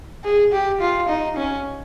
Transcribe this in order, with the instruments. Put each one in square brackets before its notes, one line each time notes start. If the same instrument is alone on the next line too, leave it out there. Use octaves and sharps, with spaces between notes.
[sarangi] G#4
G4
F4
D#4
C#4